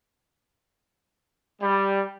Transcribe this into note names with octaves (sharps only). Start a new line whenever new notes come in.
G3